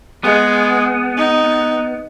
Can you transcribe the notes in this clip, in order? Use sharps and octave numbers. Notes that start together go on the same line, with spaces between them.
G#3 B3
D#4